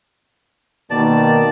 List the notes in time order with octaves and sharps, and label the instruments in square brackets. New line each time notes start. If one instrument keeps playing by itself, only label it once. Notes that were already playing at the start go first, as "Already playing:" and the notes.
[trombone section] B2 D#3 A#3 [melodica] D5 A5